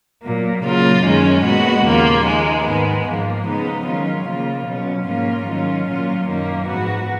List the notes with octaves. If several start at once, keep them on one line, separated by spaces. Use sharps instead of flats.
A#2 F#3 A#3
C#3 F#3 A#3 F4
F#2 D#3 G#3 C#4
A#2 G#3 B3 F#4
D#2 C#3 F3 A#3 F4
D#3 G#3 D#4
G#2 D#3 G#3 B3
G#2 F3 A#3
C#3 F3 G#3 B3 D#4
D#3 F#3 C#4 F4
C#3 F3 A#3 F4
B2 F#3 C#4
G#2 F3 A#3 C#4 F4
D#3 F#3 C#4 F4
A#2 F#3 C#4 F4
F#2 D#3 A#3 C#4
G#2 F3 B3 F#4